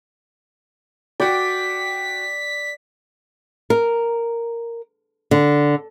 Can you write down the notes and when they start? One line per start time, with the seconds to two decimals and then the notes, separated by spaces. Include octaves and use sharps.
1.20 F#4 D5 G5 B6
3.70 A#4
5.31 D3